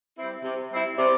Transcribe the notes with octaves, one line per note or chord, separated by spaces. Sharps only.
G3 C4 E4
C3
G3 C4 E4
C3 D5